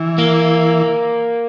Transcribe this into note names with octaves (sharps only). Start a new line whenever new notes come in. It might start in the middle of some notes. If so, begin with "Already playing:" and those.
Already playing: E3
A#3